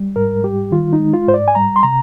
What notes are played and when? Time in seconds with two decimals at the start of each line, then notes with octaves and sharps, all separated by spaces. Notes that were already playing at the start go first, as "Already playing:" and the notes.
Already playing: G3
0.16 G#2 A#4
0.43 G3 G4
0.71 D#3 F4
0.93 D#4
0.99 G#3
1.13 F4
1.27 G#2 C5
1.34 D5
1.48 G#5
1.55 G3 A#5
1.76 C6
1.83 C3 A#5